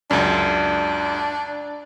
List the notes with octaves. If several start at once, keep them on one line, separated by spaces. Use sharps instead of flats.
C#2 F#2 D4